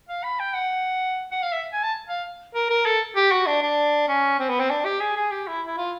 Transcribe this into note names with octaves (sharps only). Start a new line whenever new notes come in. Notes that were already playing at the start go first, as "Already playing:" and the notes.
F5
B5
G5
F#5
F#5
F5
E5
G#5
A5
F5
A#4
A#4
A4
G4
F#4
D4
D4
C#4
C4
B3
C4
D4
G4
G#4
G#4
G4
E4
E4
F4